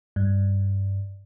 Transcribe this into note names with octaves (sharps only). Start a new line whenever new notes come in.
G2